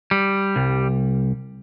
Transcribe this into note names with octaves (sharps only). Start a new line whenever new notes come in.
G3
C2